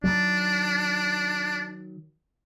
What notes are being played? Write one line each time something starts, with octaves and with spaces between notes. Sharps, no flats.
D#3 F#3 D4